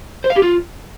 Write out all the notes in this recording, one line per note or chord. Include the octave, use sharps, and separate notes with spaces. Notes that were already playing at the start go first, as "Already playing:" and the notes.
C5
F5
G4
F4